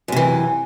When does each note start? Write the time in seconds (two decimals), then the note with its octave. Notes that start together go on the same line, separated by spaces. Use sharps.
0.08 F#2
0.12 C3
0.16 E3